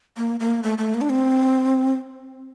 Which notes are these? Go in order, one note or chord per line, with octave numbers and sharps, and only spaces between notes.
A#3
A#3
A3
A3
A#3
D4
C4